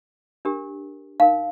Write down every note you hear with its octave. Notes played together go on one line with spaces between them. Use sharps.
D4 G4 A#4
D#4 A#4 F5